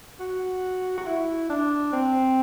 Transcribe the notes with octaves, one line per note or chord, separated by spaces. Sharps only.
F#4
F#4
E4
D4
C4